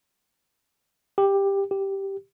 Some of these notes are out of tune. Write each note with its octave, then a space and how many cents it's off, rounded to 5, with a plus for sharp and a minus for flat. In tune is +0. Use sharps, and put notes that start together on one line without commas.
G4 +10
G4 -5